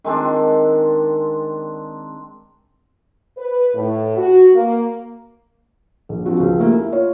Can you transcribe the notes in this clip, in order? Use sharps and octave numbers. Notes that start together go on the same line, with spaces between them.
D#3 G#3 C4 D4
B4
A2
F#4
A#3
A#1
F3 C4 F#4
C#2 F3
A3 A#3 G4
E4
F4 C#5